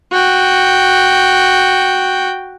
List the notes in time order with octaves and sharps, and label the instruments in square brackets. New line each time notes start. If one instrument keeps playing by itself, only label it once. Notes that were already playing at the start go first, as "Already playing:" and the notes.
[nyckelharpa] F#4 G5